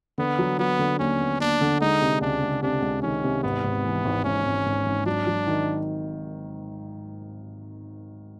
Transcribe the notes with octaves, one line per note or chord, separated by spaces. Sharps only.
D3 B3
F#3
F#3 B3
D3
D#2 C#4
B3
D#2 D4
D3
G#3 D#4
C3
C#2 D4
C#2
C3 D4
C#2
D#3 C#4
C3
G#1 B3
G#1
E3
G#1
G#1 C#4
G#1
G#1
G#1
F#3 D4
F#3
D#3